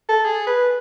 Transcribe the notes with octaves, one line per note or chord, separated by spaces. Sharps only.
A4
G#4
B4